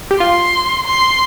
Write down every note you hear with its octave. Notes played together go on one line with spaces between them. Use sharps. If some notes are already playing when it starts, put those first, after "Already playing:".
G4
F4 C6
C6